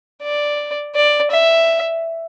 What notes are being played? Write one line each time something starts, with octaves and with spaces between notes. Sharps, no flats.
D5
D5
E5